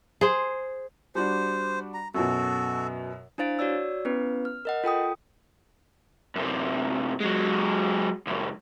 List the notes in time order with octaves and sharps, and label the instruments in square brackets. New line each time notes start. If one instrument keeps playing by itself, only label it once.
[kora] G#4 C5
[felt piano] G3 D4 F#4 [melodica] C5
[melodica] A#5
[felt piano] F#2 B2 [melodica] F#4 A4
[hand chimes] D4 E4 C5 F5 A6 D7
F#4 C#5 D5 E6
B3 C#4 E4 B4
F6
A#4 D#5 F#5
F4 A4 G5 D#6
[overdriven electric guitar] F#2 C3
F#3 G#3
C#2 F#2